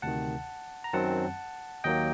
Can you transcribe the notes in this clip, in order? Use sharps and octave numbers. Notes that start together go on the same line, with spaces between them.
D2 C3 D#3 F#5 A5
A#5
F#2 D#3 F#3 C4 F#5 A5
D#2 D#3 F#3 A#3 D#5 G5